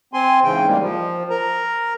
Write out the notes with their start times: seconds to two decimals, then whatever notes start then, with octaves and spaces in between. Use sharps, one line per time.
0.13 C4 G#5 C6
0.44 G#2 C#3 E3 G5
0.68 G3 G#3 A#3
0.82 F3
1.30 A#4 A#5